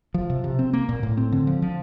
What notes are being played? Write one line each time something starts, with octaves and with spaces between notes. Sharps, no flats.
F3
C3
C3
C4
A#3
A#2
A2
C4
D3
F3
F3